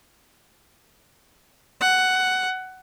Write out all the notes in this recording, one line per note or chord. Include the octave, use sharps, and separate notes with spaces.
F#5